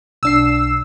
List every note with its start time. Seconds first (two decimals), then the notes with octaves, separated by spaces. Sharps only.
0.23 B1 D4 E6 C7 E7